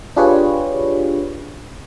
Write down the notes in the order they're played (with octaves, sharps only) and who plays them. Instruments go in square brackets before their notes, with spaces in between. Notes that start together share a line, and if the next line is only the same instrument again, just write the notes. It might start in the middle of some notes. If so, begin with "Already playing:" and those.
[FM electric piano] D4 F4 G4 G#4 B4 C#5